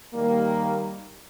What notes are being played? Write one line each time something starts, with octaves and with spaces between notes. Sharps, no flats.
D#2 D#3 G3 A#3